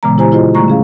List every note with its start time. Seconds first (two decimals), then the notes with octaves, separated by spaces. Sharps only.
0.03 A#2 C#3 E3 G#3 B3 A#5
0.18 E4 G4 C5 G#5 A#5
0.32 E4 F4 G#4 C5 D#5
0.55 D3 G3 A3 A#5 C#6
0.68 C#4 G#4 F5